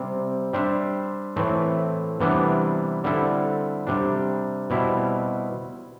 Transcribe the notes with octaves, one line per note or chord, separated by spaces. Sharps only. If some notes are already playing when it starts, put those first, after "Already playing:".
Already playing: C3 G3 C4
G3 D4 G4 C5 E5
A2 E3 A3 C4
C3 E3 G3 B3 D4
D3 G3 C4 E4 A4
C3 G3 D4
B2 G3 C4 E4